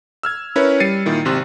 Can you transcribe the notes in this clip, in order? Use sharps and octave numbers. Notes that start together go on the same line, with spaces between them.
E6 F6 G#6
C#4 E4 A#4 B4 C#5
G3 A6 C7 C#7 D#7
A#2 D#3 E4
G#1 C3 C6 F#6